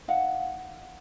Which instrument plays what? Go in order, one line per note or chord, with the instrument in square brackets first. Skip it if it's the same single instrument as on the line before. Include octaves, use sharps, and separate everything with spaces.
[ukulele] D#4 F5 F#5